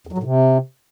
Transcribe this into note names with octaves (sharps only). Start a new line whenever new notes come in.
E2
F#3
A2
C3